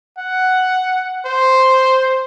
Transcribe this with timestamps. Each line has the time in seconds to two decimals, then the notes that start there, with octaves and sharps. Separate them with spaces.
0.18 F#5
1.26 C5